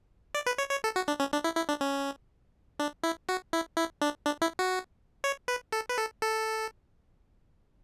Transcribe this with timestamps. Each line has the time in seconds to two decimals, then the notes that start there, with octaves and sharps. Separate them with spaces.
0.35 D5
0.46 B4
0.58 C#5
0.71 C#5
0.84 A4
0.96 F#4
1.08 D4
1.20 C#4
1.33 D4
1.44 E4
1.56 E4
1.69 D4
1.81 C#4
2.79 D4
3.03 E4
3.29 F#4
3.53 E4
3.77 E4
4.02 D4
4.26 D4
4.42 E4
4.59 F#4
5.24 C#5
5.48 B4
5.72 A4
5.89 B4
5.98 A4
6.22 A4